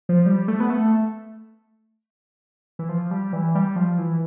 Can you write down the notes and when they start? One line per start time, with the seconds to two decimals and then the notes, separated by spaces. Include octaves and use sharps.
0.09 F3
0.26 G3
0.48 A3
0.60 B3
0.70 A3
2.79 E3
2.89 F3
3.11 G3
3.33 E3
3.55 G3
3.76 F3
3.98 E3